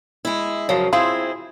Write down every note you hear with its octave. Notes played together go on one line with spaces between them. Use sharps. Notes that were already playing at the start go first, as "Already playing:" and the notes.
G#3 E4
F#2 C#3 F3
C4 E4 F4 G#4